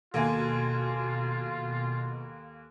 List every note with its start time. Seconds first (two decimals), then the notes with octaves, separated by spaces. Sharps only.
0.14 D#2 B2 A#3 F4 A4 G#5